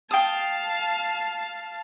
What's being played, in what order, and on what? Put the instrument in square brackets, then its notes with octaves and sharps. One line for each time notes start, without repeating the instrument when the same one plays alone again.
[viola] F5 A5 [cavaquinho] G5 D#6